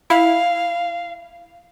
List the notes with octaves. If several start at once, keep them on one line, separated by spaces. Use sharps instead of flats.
E4 F5